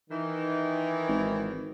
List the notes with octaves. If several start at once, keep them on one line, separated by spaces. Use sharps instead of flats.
D#3 E3
G#1